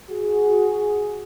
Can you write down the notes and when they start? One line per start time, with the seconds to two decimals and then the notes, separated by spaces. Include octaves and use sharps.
0.10 F#4 G#4